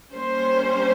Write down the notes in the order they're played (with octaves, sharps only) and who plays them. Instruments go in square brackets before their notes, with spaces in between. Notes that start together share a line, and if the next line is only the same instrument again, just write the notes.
[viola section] G3 A#3 C#4 C5